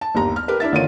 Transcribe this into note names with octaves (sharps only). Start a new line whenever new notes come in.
A5
G1 D#2 G3 A#5
F6
G4 A#4 B4
D4 E4 E5 A6
F#1 D3 D#3 F4 C#5 D#7